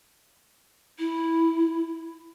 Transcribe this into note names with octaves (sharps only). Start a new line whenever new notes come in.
E4